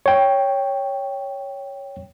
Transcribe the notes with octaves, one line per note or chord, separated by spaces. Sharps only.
C#5 G5